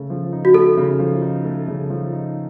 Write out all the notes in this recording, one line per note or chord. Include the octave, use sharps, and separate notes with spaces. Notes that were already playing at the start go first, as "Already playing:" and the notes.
Already playing: C#3 A3
F3
D#4
F#4
A3 A4
C#3
F3
D#4
A3
C#3
F3
D#4